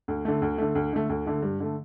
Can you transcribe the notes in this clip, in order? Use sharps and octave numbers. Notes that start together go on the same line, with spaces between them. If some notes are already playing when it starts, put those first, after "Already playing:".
D2
D3 A3
D2
D3 A3
D2
D3 A3
D2
D3 A3
G2
D3 A3